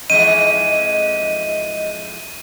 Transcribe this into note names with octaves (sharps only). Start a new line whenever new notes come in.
F2 G#2 E3 D#5 D#7